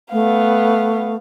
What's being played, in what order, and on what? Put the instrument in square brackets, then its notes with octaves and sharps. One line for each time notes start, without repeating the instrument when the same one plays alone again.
[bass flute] A3 [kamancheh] B3 F5